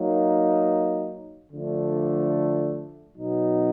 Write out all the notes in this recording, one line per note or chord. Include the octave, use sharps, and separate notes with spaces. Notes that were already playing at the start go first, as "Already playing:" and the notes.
Already playing: F#3 A#3 D#4
D3 F3 A3 D4
B2 F#3 B3 D#4